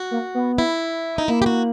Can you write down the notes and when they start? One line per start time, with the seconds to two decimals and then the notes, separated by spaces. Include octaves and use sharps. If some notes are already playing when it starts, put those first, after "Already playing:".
Already playing: F#4
0.11 A#3
0.34 B3
0.58 E4
1.18 D#4
1.28 A#3 E4
1.42 G4
1.46 F#4